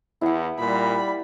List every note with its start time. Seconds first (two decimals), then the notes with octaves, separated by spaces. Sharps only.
0.21 E2 E4 F#5
0.59 A#2 G3 B5